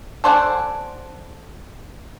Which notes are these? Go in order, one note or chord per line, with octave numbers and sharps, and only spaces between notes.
A4 C5 D5 F#5 G#5